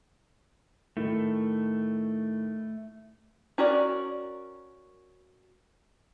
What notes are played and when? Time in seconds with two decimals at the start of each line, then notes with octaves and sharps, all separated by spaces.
0.97 A2 D#3 A3
3.58 C#4 F#4 A#4 D5